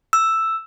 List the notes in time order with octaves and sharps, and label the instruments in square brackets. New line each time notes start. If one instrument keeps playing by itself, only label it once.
[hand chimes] E6